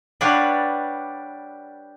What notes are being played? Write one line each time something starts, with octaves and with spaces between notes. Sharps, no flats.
G3 D4 B4 C#5 F5 F#5